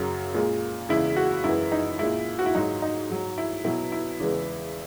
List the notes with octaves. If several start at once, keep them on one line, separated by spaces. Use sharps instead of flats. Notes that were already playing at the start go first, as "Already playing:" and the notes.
Already playing: F#2 C#3 F#3
A#2 G#3
E2 C#3 G#3 E4
F#4
F#2 E3 G#3 E4
D#4
A#2 G#3 E4
F#4
E4
G#2 F#3 D#4
D#4
G#2 F#3
E4
B2 F#3 E4
E4
E2 C#3 E3 G#3